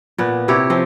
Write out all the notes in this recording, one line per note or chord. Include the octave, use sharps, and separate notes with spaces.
A#2 B3
C3 E4 G4 C#5
F3 C4